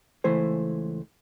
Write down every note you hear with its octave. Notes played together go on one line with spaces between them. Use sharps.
C#2 E3 A3 C5 G#5